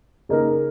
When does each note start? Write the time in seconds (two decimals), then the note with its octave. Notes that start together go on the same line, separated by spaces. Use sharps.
0.29 C#3 A#3 D#4 A#4